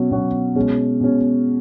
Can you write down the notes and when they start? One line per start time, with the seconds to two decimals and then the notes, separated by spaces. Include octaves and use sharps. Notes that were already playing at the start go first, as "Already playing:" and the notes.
Already playing: B2 F#3 C#4 F#4
0.11 B2 F#3 C#4 F#4 C#5
0.56 B2 G#3 C#4
1.01 B2 G#3 C#4